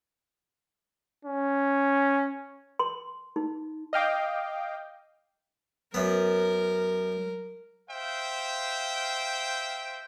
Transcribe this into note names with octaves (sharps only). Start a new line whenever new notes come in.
C#4
C6
D#4
D#5 F5 G5 D6
F#2 F#3 B3 A#4
C5 E5 F5 G5